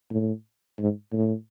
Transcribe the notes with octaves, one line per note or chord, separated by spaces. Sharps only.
A2
G#2
A2